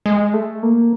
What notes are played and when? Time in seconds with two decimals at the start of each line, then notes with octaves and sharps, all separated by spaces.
0.06 G#3
0.33 A3
0.63 A#3